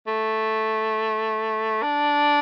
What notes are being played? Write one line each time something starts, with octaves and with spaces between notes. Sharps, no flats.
A3
D4